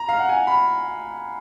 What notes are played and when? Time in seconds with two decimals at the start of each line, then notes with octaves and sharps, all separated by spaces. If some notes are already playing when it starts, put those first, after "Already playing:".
Already playing: A#5
0.09 F5
0.19 F#5
0.29 G#5
0.47 B5